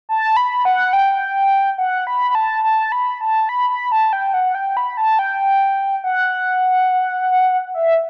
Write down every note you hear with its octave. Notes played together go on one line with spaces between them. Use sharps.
A5
B5
F#5
G5
F#5
B5
B5
A5
A5
B5
A5
B5
B5
A5
G5
F#5
G5
B5
A5
G5
F#5
E5